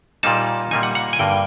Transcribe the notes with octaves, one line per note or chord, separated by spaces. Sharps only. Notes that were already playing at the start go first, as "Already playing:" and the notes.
A#2 G3 A#3 D#4 A5
A#2 G3 A#3 D#4 G#5
F#5
F#5
G#5
G2 D3 G3 A#3 G5